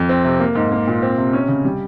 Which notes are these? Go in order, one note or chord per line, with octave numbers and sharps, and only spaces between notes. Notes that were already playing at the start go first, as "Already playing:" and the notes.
Already playing: F2
C4
C3
A#3
G#2
A#3
A#2
C4
C3
C#4
C#3
G3